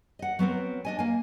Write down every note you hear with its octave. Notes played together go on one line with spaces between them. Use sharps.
D#5 F#5
F#3 B3 C4 A#4
D4 D#5 G#5
A#3 G#5